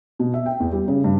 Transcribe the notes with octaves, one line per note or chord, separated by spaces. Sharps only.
B2
E5
G5
E2
G3
C#3
G2